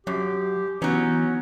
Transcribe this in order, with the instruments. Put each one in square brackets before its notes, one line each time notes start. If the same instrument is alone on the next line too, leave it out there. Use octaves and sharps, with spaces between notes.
[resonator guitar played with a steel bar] F#2 [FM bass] F#3 [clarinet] G4
[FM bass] E3 [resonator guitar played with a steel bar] F#3 C#4 [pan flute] B3 [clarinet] D#4